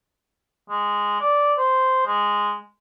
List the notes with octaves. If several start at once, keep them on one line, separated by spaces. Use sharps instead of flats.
G#3
D5
C5
G#3